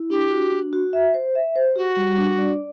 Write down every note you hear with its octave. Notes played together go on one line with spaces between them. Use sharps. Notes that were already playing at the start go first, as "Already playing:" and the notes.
Already playing: E4
D4 G4
F#4
D4
F#4
E5
C5
E5
C5
F#4 G4
G3
D4
D5